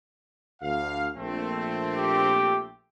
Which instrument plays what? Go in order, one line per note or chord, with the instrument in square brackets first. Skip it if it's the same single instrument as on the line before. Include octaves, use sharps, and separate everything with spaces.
[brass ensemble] D2 F5
A#1 A3 C4
[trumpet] G4